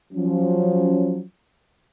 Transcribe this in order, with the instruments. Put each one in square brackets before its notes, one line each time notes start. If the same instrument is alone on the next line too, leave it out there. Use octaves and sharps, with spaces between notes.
[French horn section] F3 F#3 C#4